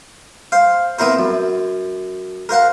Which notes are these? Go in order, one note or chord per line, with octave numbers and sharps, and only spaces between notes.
C5 F5
B3 C4 E4 A#4 C5
F#2
A#4 C5 F5 F#5